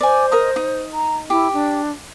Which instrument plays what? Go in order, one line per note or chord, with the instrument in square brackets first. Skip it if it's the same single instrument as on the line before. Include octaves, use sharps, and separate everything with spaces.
[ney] C5 [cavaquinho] D5 G#5
[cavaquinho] A#4 D#5 D#6
D#4
[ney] A#5
[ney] E4 [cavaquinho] G4
[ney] D4